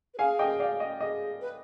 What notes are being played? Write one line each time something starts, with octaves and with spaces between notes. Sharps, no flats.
B4
G#4 F5 G#5
D#5 G5
D5 F5
D#5
G#4 D#5
B4